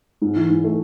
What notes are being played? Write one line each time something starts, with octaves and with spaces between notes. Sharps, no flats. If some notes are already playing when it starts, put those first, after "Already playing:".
G#2
E3
G#2
A3